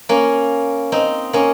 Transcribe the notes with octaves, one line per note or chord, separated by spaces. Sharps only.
A#3 C#4
C4 D#4
A#3 C#4